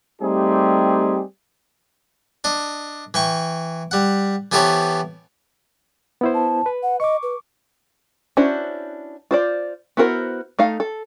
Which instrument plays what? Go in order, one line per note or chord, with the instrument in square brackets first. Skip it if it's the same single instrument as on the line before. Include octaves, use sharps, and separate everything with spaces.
[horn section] G3 A3 C4 D#4 G4 G#4
[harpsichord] D4 D#5
E3 G5 C#6
G3 F#5
E3 B3 G4 A4 C5 C#5
[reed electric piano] B3 E4 C5
[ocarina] A5
[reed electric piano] B4
[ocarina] F#5
[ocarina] D#5 [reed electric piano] C#6 D6
[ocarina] B4
[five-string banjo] C#4 D4 E4 F#4 C5
F4 C5 D5
B3 E4 F#4 A#4 C5
A3 D#4 F5
A4